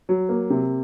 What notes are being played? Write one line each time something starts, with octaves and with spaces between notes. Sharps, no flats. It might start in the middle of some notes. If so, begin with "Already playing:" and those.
F#3
A#3
C3